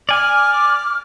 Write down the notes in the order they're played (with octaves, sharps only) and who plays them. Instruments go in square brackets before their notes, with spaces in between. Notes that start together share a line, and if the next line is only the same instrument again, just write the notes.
[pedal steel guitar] D5 G#5 [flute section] D6 F6